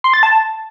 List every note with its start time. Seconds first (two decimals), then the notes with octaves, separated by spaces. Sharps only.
0.04 C6
0.14 A6
0.23 A5